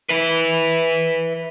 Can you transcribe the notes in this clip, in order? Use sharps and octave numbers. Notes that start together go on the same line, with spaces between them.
B4 E5